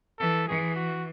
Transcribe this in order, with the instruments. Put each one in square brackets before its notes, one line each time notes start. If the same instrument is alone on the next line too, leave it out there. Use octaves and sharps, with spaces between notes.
[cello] E3 [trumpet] A4
[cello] E3 [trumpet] G#4
[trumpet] F#4